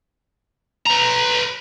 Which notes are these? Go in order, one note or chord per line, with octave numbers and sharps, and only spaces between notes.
B4 A#5